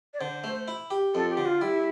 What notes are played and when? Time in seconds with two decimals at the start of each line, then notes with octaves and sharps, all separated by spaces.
0.14 D5
0.20 D3 C5
0.44 A3
0.68 E4
0.91 G4
1.14 F2 A4
1.30 G4
1.37 D3
1.46 F4
1.61 G3 E4